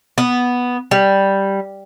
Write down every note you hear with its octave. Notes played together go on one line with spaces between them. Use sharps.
B3
G3